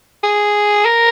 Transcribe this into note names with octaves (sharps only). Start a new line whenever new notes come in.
G#4
A#4